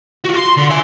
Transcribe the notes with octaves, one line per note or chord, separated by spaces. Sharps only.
F4 F#4
C6
D3
E5 G#5